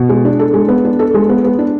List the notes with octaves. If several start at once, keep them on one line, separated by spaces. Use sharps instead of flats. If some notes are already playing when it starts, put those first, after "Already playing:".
Already playing: B2
G#3
D4
A4
G#3
B3
D4
A4
G#3
B3
B3
D4